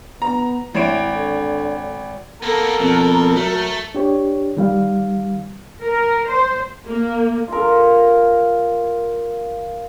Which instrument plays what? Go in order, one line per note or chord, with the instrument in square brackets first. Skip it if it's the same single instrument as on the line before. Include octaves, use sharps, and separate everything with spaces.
[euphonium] B3 [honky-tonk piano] A#5
[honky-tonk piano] G#1 C#5 D7 [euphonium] E4
[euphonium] D3
[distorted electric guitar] A#3 B3 [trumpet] A4 [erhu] A#4
[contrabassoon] F2 [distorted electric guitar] B2
[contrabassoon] F#3 [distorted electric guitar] A3
[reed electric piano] D4 G4 C#5
D#3 G3 F5
[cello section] A#4
C5
[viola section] A#3
[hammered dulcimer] F4 A#4